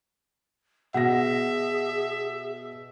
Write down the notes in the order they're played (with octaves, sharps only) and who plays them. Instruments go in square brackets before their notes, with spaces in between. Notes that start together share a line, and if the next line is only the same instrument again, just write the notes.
[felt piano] B2 A#6 [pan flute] G#4 [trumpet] E5 [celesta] F#5